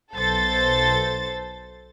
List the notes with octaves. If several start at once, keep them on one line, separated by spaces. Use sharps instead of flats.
B1 A4 C5 A6